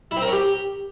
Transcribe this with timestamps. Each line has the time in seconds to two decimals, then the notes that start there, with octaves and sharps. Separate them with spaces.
0.11 E4
0.17 C4
0.22 A#4
0.27 C#4
0.32 G4